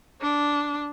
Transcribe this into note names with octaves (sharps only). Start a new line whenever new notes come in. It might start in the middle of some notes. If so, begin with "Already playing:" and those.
D4